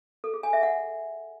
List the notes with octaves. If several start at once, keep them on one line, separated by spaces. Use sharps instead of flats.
A4
G#4
G#5
E5
F#5